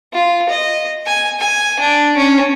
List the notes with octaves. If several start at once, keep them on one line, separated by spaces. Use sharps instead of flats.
F4
D#5
G#5
G#5
D4
C#4